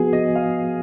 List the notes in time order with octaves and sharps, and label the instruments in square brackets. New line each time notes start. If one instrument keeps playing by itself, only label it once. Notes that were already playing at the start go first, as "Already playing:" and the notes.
Already playing: [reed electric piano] F3 B3 F#4 [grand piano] G#4
[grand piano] D#5
F5